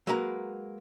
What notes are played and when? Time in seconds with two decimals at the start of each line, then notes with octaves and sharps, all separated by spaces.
0.07 F#3 G#3 A#3 B4 A#5